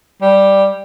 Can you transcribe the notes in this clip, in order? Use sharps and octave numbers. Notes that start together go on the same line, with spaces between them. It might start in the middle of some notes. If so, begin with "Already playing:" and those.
G3